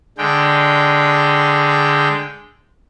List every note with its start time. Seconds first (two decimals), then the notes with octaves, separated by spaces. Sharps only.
0.18 D3 G#3 G5